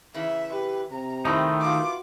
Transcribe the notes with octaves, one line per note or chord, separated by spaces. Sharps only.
C#3 E3 E5
G4 B4
C3 A#5
D#3 A3 C4 D#4 E4
B3 F4 F#4 D6